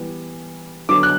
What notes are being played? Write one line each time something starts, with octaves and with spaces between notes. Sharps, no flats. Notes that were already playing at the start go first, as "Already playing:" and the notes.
Already playing: E3 G3 B3
D3 F#3 B3 D6
F#6